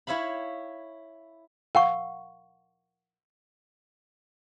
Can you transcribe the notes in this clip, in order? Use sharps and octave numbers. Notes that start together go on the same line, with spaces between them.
E4 C#5 E5 F5 B5
A#4 F5 F#5 C#6